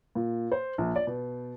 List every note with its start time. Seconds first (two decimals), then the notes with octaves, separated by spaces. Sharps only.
0.15 A#2
0.52 C5
0.78 A#1
0.96 D5
1.07 B2